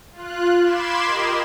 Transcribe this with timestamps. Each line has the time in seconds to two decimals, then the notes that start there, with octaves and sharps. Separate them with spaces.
0.12 F4 F#6
0.62 B5 C6 D6 G#6 E7
1.04 G4 A#4 D#5